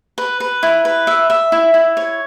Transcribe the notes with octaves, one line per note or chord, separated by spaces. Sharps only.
B4
B4
E4
B4
E5
E5
E4
E4
C#5